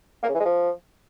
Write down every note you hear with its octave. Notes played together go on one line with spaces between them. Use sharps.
A#3
C#3
E3
G#3
F3